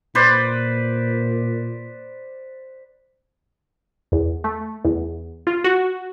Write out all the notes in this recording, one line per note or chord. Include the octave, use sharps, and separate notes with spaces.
A#2 B4 C5 D5
E2
A3
E2
F4
F#4